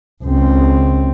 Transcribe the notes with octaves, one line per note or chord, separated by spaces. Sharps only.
C#2 C4